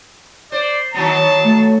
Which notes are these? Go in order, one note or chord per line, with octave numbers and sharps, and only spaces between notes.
C5 D5
D#3 F#3 B3 A5
A3